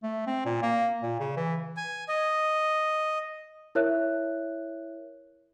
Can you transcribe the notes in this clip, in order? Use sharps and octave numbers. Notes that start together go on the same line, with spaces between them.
A3
C4
A#2
A#3
A#2
C#3
E3
G#5
D#5
E4 A#4 C#5 E5 F#6